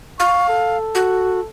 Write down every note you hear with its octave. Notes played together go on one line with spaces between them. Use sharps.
F5 C#6
A4
F#4